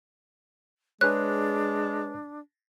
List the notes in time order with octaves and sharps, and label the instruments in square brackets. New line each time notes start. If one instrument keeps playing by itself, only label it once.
[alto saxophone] G#3 [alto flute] D4 [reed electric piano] G#4 B4 C#5 [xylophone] F#6